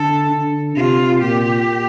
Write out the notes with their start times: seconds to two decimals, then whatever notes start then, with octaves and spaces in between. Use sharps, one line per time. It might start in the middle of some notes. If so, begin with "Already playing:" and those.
Already playing: D3 A4
0.32 D3
0.76 C3 F4
1.22 A#2 G4